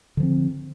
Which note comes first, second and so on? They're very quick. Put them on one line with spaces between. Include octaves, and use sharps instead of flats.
D3 F3 C4